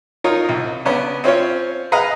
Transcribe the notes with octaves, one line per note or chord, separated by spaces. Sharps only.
D#4 F4 A#4 C#5
C2
C#3 B3 C#4 D4
C4 C#4 F4 C#5
G#4 B4 D#5 F5 F#5 A#5